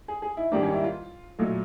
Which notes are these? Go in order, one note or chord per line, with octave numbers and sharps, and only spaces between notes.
G#4
G#4
E4
G#2 D#3 G3 A#3 D4
C#4
E4
F4
A#2 F#3 A3 F4